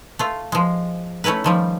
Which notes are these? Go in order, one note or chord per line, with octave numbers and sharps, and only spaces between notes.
A3 F4
F3 G#3
A3 C#4 E4 A#4 B4
D#3 F3 G3